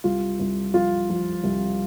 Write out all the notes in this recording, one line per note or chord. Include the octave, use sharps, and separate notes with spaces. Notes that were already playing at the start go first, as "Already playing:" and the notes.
C2 F4
C2
F3 F4
F3
C2